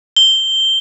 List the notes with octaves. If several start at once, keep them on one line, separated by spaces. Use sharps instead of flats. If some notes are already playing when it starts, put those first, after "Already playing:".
G7